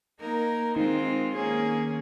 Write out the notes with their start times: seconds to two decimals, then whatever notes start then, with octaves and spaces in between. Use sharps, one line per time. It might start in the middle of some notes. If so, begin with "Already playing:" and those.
0.19 A#3 D#4 A#4
0.76 D#3 G#3 C4 F4 C5
1.33 A#3 C#4 G#4